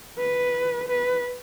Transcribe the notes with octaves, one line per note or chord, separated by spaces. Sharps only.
B4
B4